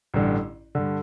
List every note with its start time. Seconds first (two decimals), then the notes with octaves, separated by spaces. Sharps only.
0.14 A1 G2 D3
0.75 G2 D3